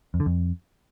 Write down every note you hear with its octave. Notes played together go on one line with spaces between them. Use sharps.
F2
D3
F2